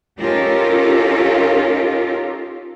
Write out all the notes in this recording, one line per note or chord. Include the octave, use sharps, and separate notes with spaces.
C#4 D#4 F4 G4 A4 A#4